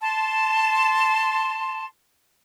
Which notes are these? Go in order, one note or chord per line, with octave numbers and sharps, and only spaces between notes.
A5 C6